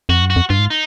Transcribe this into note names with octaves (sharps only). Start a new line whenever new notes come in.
F2 F#4
F#2
F#4
F2
G2 F4
G#2
D#4